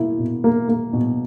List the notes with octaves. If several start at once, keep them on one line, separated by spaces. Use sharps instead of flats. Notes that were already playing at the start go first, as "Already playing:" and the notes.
Already playing: B2 A#3 E4
B2
A#3
A#3
B2